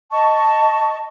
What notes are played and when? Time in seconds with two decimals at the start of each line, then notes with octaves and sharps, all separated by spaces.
0.11 D#5 A5 C#6